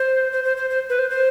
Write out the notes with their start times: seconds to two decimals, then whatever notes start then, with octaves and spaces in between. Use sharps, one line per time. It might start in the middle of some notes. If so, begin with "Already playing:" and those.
Already playing: C5
0.32 C5
0.44 C5
0.57 C5
0.70 C5
0.90 B4
0.99 C5
1.10 C5